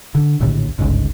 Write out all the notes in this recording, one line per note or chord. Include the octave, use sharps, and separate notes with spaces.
D3
A#1 D#2 A2 D3
G1 C#2 G#2